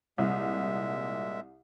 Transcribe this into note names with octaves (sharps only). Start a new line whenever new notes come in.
C2 A#2 G#3 E5